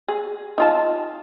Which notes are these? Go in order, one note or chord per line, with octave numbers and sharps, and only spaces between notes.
G#4
D#4 F4 A5